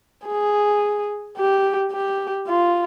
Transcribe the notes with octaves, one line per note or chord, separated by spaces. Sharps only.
G#4
G4
G4
F4